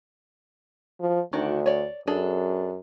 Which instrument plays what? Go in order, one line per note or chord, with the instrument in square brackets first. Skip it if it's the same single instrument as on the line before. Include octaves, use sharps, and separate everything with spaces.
[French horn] F3
[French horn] D2 [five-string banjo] D#3 D4 F#4
[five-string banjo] C#5 D5
[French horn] F#2 [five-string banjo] D4 G#4 A4